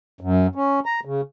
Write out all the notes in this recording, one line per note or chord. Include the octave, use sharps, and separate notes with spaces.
F#2
C#4
A#5
C#3